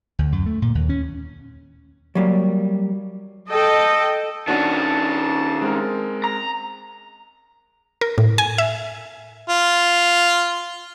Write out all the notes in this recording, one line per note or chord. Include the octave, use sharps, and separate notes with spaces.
D2
F#2
A3
A#2
D#2
C#4
F#3 G3 A#3
A4 D#5 G5
D#3 C#4 D4 F#4 A5
G#3 C4 A#4
A#5
A#4
A2
G#5
E5
F4